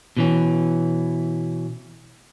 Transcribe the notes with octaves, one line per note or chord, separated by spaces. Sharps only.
B2 E3 C#4